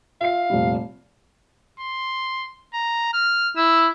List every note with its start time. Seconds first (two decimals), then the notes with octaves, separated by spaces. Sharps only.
0.21 F4 E5 F5 C7
0.50 F1 A#2 G3
1.80 C6
2.74 A#5
3.13 F6
3.57 E4 E6